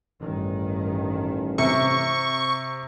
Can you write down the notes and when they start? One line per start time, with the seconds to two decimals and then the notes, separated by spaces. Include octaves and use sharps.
0.21 A1 G2 D#3
1.58 C3 C#6